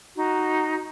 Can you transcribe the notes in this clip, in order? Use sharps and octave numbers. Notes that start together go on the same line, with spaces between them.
D#4 F#4